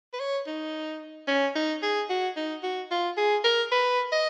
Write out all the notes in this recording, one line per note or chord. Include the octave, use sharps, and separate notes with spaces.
B4
C#5
D#4
C#4
D#4
G#4
F#4
D#4
F#4
F4
G#4
A#4
B4
D#5